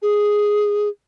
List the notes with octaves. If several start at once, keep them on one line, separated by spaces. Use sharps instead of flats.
G#4